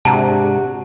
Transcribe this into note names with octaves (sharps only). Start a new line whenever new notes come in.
G#2 C3 G#3 D4 F#4 A5 A#5